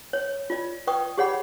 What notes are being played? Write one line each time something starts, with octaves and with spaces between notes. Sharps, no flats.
C#5
F4 D5
B4 D5 G5 C#6 D#6
G4 G#4 C#5 D5 F#5 B5